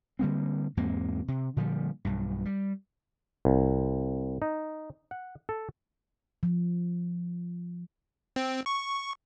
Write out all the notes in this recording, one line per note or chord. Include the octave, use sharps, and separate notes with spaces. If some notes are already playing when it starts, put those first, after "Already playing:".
D3 G3 A#3 C4
E2 G#2 A#3 C4
C3
A#2 D3 F3 G3
B1 G2
G3
C2
D#4
F#5
A4
F3
C4
C#6